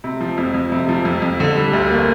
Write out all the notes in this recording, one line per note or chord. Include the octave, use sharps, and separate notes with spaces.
C3
F3
F2
F2
C3
F3
F2
F2
D3
G3
D2
A#3